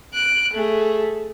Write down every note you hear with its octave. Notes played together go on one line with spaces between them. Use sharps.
F#6 D7
A3 G#4